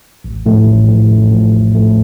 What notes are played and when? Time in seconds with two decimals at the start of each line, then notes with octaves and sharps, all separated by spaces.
0.24 A1
0.46 A2 F3 A3
0.67 A1
0.88 A2 F3 A3
1.09 A1
1.31 A2 F3 A3
1.52 A1
1.73 A2 F3 A3